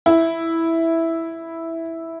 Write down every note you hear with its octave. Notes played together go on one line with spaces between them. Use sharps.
E4